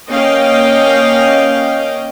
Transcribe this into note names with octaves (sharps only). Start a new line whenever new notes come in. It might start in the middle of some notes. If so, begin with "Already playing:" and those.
A#3 C#4 D#5 F5 G5